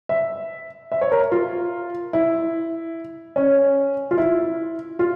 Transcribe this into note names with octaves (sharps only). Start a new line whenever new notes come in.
E5
E5
C#5
A#4
F4
E4
C#4
F4
E4
F4